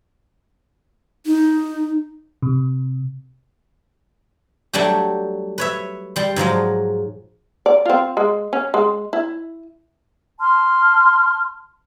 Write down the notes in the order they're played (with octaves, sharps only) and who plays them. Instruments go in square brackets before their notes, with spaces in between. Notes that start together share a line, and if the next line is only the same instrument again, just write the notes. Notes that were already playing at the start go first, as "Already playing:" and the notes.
[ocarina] D#4
[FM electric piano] C3
[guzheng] F#3 G3 A3 D4 G4
B4 C#5 E5
G3 C6
G#2 F3 F#3 G#3
[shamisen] D5
C4 F4
G#3
C#4
G#3
E4
[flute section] A5 C6 F6